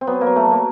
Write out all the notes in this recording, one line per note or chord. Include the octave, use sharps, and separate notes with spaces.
C4
F#3 B3
A#3
F#3
A3
F#3
A#3